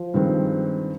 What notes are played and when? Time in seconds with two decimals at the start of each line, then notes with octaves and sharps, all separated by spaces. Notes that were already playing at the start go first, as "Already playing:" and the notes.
Already playing: F3
0.14 G2 D#3 G#3 C4